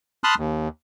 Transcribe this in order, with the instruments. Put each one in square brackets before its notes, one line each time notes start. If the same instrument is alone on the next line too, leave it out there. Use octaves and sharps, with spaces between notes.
[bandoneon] A5 B5 C6 D#6 F6 F#6
D#2